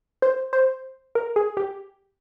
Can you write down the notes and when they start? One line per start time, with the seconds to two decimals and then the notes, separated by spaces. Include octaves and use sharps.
0.22 C5
0.53 C5
1.15 A#4
1.36 G#4
1.57 G4